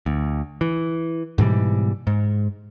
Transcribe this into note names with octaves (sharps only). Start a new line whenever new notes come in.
D2
E3
G#2 B2 E3 G3
G#2